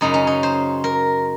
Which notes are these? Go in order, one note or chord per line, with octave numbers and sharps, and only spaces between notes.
F#2 C#3 D#4
C#4
D#4
C5
A#4